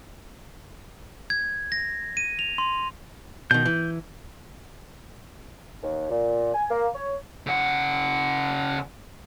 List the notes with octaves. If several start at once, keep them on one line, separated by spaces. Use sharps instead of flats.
G#6
A#6
D#7
F7
C6
B2 D#3 G6
E3
D#2
A#2
G#5
A#3
C#5
C#3 F#5